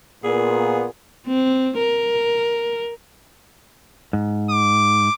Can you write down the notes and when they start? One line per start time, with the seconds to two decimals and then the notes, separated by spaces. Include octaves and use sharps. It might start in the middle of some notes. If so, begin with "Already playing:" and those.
0.24 A#2 B3 G#4
1.27 C4
1.78 A#4
4.13 G#2
4.50 D6